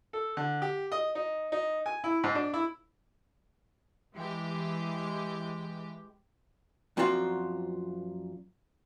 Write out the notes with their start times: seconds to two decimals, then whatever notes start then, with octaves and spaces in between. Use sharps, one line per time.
0.13 A4
0.37 D3
0.62 G4
0.92 D#5
1.15 D#4
1.52 D#4
1.86 G#5
2.04 E4
2.24 G#2
2.35 D4
2.54 E4
4.14 E3 G#3 G4
6.97 F#2 A#2 F3 C4 F4 F#4